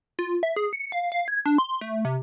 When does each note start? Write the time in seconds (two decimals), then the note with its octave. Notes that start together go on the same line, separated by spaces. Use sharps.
0.19 F4
0.43 E5
0.56 G#4
0.73 C#7
0.92 F5
1.12 F5
1.28 G#6
1.46 D4
1.58 C6
1.81 A3
2.05 C3